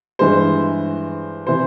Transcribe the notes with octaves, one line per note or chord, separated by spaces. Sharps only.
G2 E3 G#3 C5
C3 E3 C5